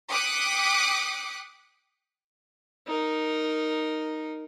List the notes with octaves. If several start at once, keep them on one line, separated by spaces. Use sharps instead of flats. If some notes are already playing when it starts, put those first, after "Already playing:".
G5 D6 D#6 F#6 B6 C#7
D#4 A#4